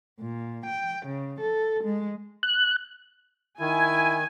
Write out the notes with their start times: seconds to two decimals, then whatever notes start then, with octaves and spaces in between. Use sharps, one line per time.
0.20 A#2
0.65 G5
1.06 C#3
1.40 A4
1.84 G#3
2.43 F#6
3.60 D#3 E4 G#5